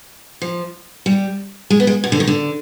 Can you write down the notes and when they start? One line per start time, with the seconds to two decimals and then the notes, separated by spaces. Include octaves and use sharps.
0.42 F3
1.06 G3
1.70 G#3
1.80 B3
1.87 G#3
2.04 B2
2.12 D3
2.20 D#3
2.27 D3